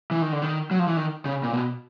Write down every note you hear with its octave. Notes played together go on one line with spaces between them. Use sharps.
E3
D#3
D3
D#3
F#3
F3
E3
D#3
C#3
A#2
B2